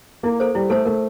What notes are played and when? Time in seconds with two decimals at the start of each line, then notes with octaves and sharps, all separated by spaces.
0.23 A#3 E4
0.40 A4 C5
0.55 G3 E4
0.70 A3 A4 C5
0.85 A3 A#4